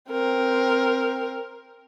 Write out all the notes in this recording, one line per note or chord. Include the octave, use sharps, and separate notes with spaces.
C4 A#4